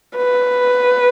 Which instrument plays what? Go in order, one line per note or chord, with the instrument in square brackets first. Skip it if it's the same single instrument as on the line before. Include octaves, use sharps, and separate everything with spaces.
[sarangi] B4